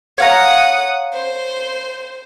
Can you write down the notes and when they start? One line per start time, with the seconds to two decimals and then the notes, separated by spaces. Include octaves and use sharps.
0.18 C#5 F5 F#5 A#5 D#6
1.13 C5